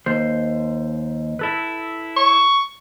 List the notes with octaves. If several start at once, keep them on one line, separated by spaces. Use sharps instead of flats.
D#2 C5
E4 A4 B4
C#6